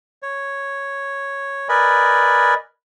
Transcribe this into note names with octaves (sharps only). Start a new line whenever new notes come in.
C#5
A#4 B4 D5 D#5 G#5 B5